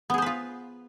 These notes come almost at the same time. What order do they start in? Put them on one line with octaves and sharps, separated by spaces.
B3 G#4 C5 B4 F4